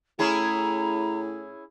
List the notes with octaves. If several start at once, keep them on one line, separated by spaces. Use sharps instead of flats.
A2 C#4 E4 G#4 A#5